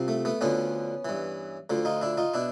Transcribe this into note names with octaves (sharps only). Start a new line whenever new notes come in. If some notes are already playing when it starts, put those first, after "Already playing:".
Already playing: C2 C3 F3
A3
A3 B3
D2 D3 F3 B3 C#4
G2 E3
D2 D3 F3
D#4 F4
D4 E4
D#4 F4
B2 D4 E4